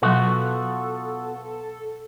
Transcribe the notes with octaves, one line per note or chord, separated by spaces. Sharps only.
B2 F#3 B3 F4 F#4 A4